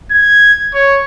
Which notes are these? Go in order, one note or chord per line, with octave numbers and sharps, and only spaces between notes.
G#6
C#5